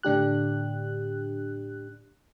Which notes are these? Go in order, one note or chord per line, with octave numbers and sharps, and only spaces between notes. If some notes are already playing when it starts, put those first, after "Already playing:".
A2 D3 D4 G4 F#6